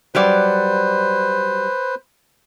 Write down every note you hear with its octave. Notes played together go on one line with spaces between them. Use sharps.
F#3 G3 B4 C5 D5